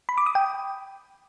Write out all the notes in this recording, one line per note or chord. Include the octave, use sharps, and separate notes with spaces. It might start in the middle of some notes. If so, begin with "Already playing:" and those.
B5
D6
D#6
G5